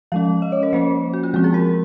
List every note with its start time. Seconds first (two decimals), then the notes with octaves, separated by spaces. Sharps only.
0.12 F3 G#3 C#4 F5
0.42 D#5
0.52 C#5
0.63 A#4
0.73 F3 A#3 C#4 C5
1.14 F#4
1.23 F4
1.34 F3 G#3 C4 F#4
1.44 G#4
1.54 A#4